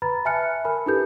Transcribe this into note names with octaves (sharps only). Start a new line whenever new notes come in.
B4 A#5 B5 A6
E5 G#5 A5 F6 F#6 C#7
A#4 G#5 B5
D4 E4 G4 A4 B4 G6